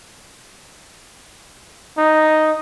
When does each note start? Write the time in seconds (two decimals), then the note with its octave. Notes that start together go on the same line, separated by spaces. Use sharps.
1.98 D#4